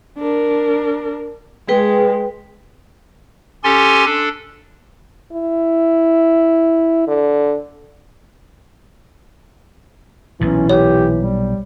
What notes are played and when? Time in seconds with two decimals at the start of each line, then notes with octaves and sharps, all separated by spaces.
0.19 D4 A#4
1.69 G#3 G#4 B4 G5
3.64 C#4 G4 A4 G#5 C6 A6
4.05 D4 A4
5.32 E4
7.08 D3
10.41 B1 A#2 E3 C#4
10.70 G4 C#5
11.17 G3